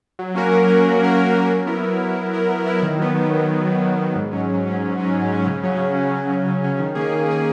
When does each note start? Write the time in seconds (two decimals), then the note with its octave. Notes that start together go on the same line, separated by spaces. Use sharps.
0.19 F#3
0.35 A#3 C#4 F#4 A#4
0.52 F#3
0.68 A#3 C#4 F#4 A#4
0.85 F#3
1.00 A#3 C#4 F#4 A#4
1.17 F#3
1.34 A#3 C#4 F#4 A#4
1.51 F#3
1.66 B3 E4 A#4
1.84 F#3
2.01 B3 E4 A#4
2.16 F#3
2.33 B3 E4 A#4
2.49 F#3
2.66 B3 E4 A#4
2.82 D#3
2.99 F#3 B3
3.16 D#3
3.32 F#3 B3
3.48 D#3
3.65 F#3 B3
3.82 D#3
3.99 F#3 B3
4.15 G#2
4.31 F#3 C#4
4.48 G#2
4.64 F#3 C#4
4.81 G#2
4.97 F#3 C#4
5.14 G#2
5.30 F#3 C#4
5.47 C#3
5.63 F#3 C#4
5.79 C#3
5.96 F#3 C#4
6.13 C#3
6.30 F#3 C#4
6.46 C#3
6.62 F#3 C#4
6.79 D#3
6.95 A#3 C#4 G#4
7.12 D#3
7.28 A#3 C#4 G#4